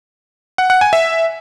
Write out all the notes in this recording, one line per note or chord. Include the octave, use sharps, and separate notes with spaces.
F#5
F#5
G#5
E5